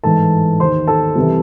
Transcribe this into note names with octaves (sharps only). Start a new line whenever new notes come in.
A1 G#2 E3 A4 A5
D#2 D#3 C5 C6
A4 A5
C2 C3 E3